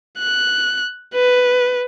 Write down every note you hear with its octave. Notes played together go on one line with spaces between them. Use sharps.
F#6
B4